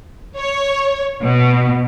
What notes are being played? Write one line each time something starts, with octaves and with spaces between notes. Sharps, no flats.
C#5
B2